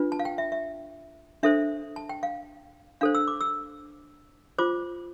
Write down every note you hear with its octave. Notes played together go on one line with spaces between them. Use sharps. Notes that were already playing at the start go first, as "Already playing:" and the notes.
Already playing: D4 F4 B4
A5
F5
G5
E5
E5
D4 A4 C5 E5
A5
G5
F5
D4 A4 C5 F5
E6
D6
E6
F4 C5 D6